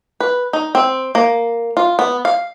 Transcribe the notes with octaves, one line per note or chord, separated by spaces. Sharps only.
B4
D#4
C4
A#3
F4
B3
F5